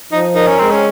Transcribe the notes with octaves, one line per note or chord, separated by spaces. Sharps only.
F3 D#4
D#4 A#4
C#4
G#3 C4
C#4